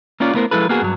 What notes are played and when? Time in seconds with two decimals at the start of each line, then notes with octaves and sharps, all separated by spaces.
0.20 A#3 C#4 F4 D5
0.34 A3 B3 E4 A#4 C5
0.51 F3 G#3 E4 A4 B4
0.69 A#3 B3 F#4 G#4
0.82 G2 F#3